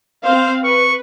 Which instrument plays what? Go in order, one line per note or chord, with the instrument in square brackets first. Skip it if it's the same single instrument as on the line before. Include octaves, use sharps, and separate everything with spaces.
[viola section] C4 F5 [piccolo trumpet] C5
[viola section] B4 [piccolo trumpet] C#6